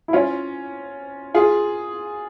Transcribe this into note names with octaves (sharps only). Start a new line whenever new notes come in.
E4
C#4 F4
F4 G#4